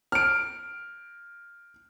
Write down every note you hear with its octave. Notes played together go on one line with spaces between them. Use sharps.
F6 D7